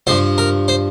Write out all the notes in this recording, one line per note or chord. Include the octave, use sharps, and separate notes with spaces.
G2 F3 C5
A#4
C5